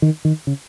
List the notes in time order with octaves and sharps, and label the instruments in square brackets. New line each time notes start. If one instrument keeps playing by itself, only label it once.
[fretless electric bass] D#3
D#3
C#3